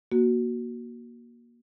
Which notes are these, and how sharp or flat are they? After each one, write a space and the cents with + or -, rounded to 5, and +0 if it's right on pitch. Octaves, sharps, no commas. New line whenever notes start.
A#3 +25 F#4 +0